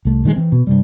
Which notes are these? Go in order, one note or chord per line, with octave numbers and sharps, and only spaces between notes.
C2 A3
A#2 D#3 F#3 G#3
E3 C4
B2
G2 C3 G3